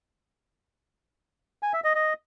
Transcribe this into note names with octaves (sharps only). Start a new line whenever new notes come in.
G#5
E5
D#5
D#5